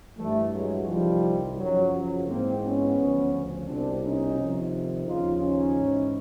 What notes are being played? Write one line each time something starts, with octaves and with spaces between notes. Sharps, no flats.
G2 E3 G3 A3
F#3 G#3
C2 C3 D#3 F3 G3
F#2 C#3 F3 F#3
F#3
G#2 E3 A#3 C4
B3 C#4
D2 C#3 F3
C2 B2 C4 D4
C#4 D#4
F2 C3 D#3
D#2 C#3 F3 D#4 F4
C#4 D#4
G#2 E3